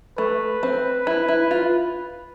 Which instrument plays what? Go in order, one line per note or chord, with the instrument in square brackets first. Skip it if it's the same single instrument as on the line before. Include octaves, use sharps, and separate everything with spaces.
[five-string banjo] A3 [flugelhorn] B4
[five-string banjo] C4
E4
E4
F4